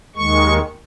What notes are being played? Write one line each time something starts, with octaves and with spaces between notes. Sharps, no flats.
D#2 D#3 G#3 C#6